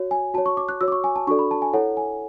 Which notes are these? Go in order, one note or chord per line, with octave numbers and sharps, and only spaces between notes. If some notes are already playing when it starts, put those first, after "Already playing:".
Already playing: F#4 C#5
G#5
F#4 C#5 A5
C#6
D6
F#6
F#4 C#5 E6
D6
C#6
G#5
A5
D4 F#4 A4 D5 C#6
B5
A5
G#5
E4 A4 C#5 F#5
G#5